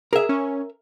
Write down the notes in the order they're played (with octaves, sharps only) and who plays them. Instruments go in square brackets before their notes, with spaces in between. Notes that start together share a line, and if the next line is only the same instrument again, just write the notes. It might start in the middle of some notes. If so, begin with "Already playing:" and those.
[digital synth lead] G#4 [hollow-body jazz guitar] A#4 E5
[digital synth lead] C#4